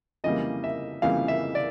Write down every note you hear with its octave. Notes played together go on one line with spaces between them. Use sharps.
F2 C#3 E3 G3 A#3 D#5
E5
F2 C#3 E3 G3 A#3 F5
E5
D5